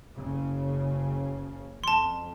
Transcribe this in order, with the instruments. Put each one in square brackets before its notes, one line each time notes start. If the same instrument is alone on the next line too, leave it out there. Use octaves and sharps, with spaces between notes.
[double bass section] F#1 C#3
[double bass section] F2 [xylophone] A5 C6